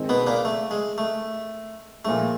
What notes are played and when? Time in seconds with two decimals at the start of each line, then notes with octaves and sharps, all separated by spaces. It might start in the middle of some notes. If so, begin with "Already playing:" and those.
Already playing: D#3 G#3 C4
0.09 B2 B3
0.27 A#2 A#3
0.45 A3
0.71 G#3
0.98 A3
2.05 A#2 F3 G#3 A3